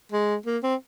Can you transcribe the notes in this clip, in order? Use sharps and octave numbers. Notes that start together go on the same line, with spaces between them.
G#3
A#3
C4